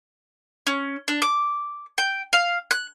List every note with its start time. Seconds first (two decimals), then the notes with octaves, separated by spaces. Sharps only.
0.67 C#4
1.08 D4
1.22 D6
1.98 G5
2.33 F5
2.71 F#6